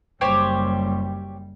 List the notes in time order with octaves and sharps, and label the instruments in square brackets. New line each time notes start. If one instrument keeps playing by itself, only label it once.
[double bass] F#1 G3 [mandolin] G4 C5 C#5